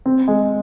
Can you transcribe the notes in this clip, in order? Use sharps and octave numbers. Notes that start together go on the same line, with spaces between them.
C4
G#3